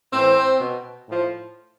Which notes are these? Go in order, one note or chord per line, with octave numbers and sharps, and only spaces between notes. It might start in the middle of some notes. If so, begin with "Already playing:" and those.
A2 E3 C4
B2
A2 F3